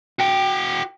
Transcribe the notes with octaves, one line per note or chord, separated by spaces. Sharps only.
F#4 G5